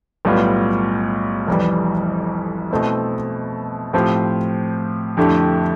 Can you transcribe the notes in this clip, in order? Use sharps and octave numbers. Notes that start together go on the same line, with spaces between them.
B1 A2 G3 B3 F4
F1 F2 E3 G3
B2 A3 C4 E4
A2 F3 C4 G4
F2 D3 A3 E4 G4